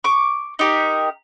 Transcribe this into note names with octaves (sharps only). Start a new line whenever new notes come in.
C#6 D6
D#4 G4 A#4